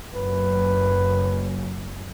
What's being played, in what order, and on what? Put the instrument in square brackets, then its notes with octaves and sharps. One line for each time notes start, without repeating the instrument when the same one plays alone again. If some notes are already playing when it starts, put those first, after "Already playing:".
[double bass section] F#1 F#2 [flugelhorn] B4